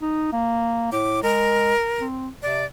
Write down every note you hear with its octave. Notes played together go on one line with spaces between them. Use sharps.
D#4
A#3
A2 D6
G#3 A#4
C4
C3 D5